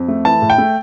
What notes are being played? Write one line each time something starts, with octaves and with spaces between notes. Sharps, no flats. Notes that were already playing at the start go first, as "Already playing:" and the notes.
Already playing: F2
A3
E3 A5
A2
G5
A3